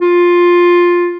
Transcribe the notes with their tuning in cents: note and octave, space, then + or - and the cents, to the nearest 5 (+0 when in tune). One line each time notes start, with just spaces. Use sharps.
F4 +10